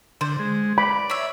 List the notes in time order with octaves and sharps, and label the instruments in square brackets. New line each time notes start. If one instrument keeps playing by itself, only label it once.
[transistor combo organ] D3 [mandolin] C5
[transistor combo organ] G#3
[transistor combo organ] D5 [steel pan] B5
[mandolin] C#5 E5